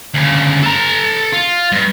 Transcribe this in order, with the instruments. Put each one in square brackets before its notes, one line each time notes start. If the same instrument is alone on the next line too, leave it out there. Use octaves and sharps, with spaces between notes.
[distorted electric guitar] D2 C#3
A4 A#5
F4
G2